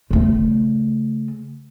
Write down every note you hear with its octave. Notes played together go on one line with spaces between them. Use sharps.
C#3 A3